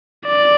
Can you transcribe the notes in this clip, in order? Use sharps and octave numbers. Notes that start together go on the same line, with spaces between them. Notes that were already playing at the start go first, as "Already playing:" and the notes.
D5